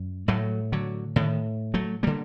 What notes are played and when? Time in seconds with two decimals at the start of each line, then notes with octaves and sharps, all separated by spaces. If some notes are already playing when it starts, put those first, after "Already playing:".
Already playing: F#2
0.28 A2 F#3 A3
0.72 D3 F#3
1.16 A2 D#3
1.74 F#3 A3
2.03 D3 G3 A#3